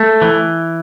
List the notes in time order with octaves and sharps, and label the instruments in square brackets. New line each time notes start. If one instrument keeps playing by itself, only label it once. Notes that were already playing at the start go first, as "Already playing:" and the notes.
Already playing: [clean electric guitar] A3
E3